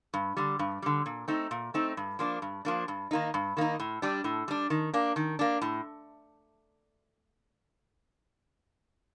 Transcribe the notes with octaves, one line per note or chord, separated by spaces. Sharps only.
G2
D3 G3
G2
D3 G3
A#2
A3 C4 D#4
A#2
A3 C4 D#4
G2
F3 A#3 D4
G2
F3 A#3 D4
G2
D#3 A#3 D#4
G2
D#3 A#3 D#4
A2
G3 D4
A2
G3 D4
D#3
A#3 D4
D#3
A#3 D4
A2